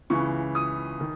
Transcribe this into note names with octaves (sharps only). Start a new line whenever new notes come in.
C#2 C#3 E3 C#6
D#6
D#3